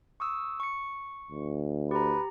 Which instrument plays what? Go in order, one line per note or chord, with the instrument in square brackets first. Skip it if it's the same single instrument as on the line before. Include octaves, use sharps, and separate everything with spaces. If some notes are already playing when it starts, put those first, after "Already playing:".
[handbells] C#6 D#6 E6
C#6 C#7
[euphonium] D2
[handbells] G4 A#5 [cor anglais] B4